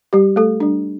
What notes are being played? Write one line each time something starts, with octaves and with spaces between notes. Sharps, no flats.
G3 G4
A3 A4
G3 D4